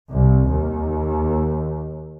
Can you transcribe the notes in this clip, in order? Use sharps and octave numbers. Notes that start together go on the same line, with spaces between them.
C2
D#2